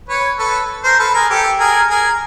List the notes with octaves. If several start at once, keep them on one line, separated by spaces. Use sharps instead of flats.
B4 C#5
A4 B4
A#4 C5
A4 B4
G#4 A#4
G4 A4
G#4 A#4
G#4 A#4